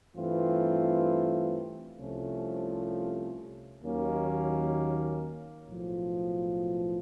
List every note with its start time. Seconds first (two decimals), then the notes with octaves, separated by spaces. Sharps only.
0.16 G2 E3 A3 C4 F4
1.99 C2 C3 F3 A3 C#4
3.83 D#2 D#3 F#3 A#3 C#4
5.67 B1 A2 F3